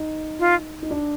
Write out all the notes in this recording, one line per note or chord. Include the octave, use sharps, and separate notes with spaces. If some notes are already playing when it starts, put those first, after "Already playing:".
Already playing: D#4
F4
D#4
D4